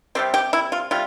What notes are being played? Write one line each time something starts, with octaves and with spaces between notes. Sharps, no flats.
C3 G3 C4 G4
G4
E4
F4
C3 G3 F4